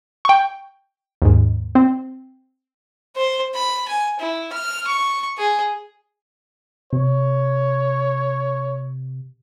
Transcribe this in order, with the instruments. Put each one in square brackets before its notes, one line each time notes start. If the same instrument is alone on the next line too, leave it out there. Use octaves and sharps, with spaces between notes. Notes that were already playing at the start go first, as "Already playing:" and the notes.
[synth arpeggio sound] G5 C#6
D#2 G#2
C4
[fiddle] C5
B5
G#5
E4
F6
C#6
G#4
[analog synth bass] C3 [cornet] C#5